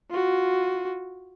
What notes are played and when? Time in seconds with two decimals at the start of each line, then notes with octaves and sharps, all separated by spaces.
0.10 F4 F#4